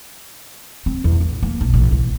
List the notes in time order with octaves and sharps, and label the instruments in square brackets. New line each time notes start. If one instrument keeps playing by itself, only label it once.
[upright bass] C4
E2
A1
A#3
B1
A1
C2